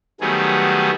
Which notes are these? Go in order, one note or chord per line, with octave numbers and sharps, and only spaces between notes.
D#3 F#3 G3 A3 B3 G#4